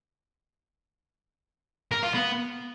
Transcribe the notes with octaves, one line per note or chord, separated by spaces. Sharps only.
A#4
F4
B3